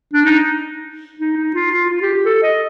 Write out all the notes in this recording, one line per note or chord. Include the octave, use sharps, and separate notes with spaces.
D4
D#4
D#4
D#4
F4
F4
F4
G4
G4
A4
D#5